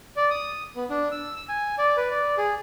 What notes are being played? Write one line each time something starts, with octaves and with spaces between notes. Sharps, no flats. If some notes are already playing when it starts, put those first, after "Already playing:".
D5
D#6
B3
D4
E6
E6
G#5
D5
B4
D5
G#4